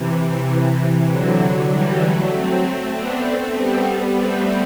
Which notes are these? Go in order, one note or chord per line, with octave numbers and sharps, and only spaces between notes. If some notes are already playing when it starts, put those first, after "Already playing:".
Already playing: C3 E3
C3
C3 E3
D3 F#3
E3 G3
F#3 A3
A3 C4
A3 C4
B3 D4
A3 C4
G3 B3
G3 B3
A3 C4